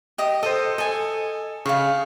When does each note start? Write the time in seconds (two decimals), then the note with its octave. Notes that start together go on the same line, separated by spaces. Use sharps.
0.18 G4 D#5 D#6
0.43 A4 C5 D#5
0.78 A4 D#5 G#5
1.66 C#3 F5 C#6